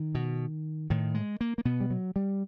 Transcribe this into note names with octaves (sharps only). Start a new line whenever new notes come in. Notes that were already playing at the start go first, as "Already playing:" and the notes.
Already playing: D#3
B2
A2 D#3
G#3
A#3
A#3
B2 B3
G3
F#3
G3